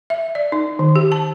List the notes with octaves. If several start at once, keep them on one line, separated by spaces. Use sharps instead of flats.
E5
D5
D#4
D#3
G4
A5